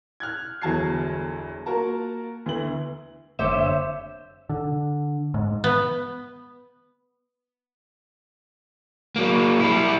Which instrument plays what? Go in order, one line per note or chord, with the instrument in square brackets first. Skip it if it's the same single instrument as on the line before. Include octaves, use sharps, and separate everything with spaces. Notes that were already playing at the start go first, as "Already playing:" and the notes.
[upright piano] F6 F#6 G#6
G1 E2 F#3 A5 G#6 C7
A#3 F4 F#4 A#4 A5 A#5
D2 B3 E4 F#7
[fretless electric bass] F#1 D3 [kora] C4 G4 C#5 [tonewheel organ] E5
[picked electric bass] D3
G#2
[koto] B3
[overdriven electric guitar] F#3 A#3
G3 E4